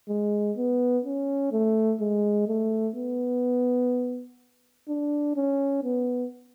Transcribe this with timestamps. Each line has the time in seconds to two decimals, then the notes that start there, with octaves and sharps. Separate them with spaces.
0.08 G#3
0.57 B3
1.05 C#4
1.52 A3
2.00 G#3
2.47 A3
2.96 B3
4.88 D4
5.36 C#4
5.84 B3